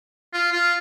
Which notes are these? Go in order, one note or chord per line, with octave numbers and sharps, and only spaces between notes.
F4
F4